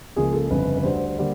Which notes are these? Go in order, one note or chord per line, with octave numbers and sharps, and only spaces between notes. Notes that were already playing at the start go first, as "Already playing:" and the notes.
C#2 C#3 F3 A#3 G#4
A4
G1 F2 C#3 B4
B4
D2 D3 G3 C5
D3 G3 A#3